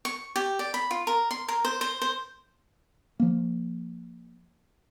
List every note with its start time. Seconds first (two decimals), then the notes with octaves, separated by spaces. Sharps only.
0.05 C#6
0.36 G4
0.59 D5
0.74 B5
0.91 F4
1.07 A#4
1.31 C6
1.48 A#4
1.65 C5
1.81 C5
2.02 C5
3.20 F3 A#3